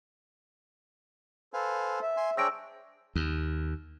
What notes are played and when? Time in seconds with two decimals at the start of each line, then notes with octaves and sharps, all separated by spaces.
1.54 A4 B4 C5 F5 G#5
2.02 E5
2.17 G#5 C6
2.37 D4 G#4 C5 C#5 G5 E6 A#6 D7
3.16 D#2